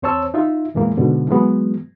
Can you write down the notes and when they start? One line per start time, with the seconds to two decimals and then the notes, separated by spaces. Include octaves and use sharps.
0.02 E2 C4 C5 C#5 A5 E6
0.34 D#4 F4 E5
0.75 F2 A#2 E3 G#3 A#3
0.97 G#2 B2 D3
1.28 E3 F#3 G#3 B3